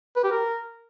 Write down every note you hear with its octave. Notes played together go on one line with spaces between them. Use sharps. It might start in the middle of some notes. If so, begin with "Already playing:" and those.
B4
G4
A#4